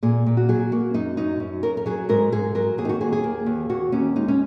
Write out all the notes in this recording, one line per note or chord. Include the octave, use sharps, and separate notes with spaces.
A#2 G#4
A#2
F#4
F#3 G#4
A#3 F#4
F#2 D#4
F#2 D#4
F#2
F#2 A#4
A#4
F#3 G#4
G#2 A#4
G#2 G#4
F#3 A#4
D#2 G#4
D#4
F#4
D#2 G#4
G#4
A#3
D#2
D#2 F#4
D#2 C#4
G#3 D#4
C#4